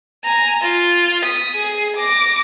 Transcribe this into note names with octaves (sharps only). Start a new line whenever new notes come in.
G#5 A#5
F4
D#6 B6
G#4 C7
D6 A#6